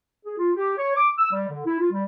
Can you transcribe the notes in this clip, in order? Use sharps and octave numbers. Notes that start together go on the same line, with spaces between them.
G#4
F4
G4
C#5
D6
E6
G3
D3
E4
F4
G3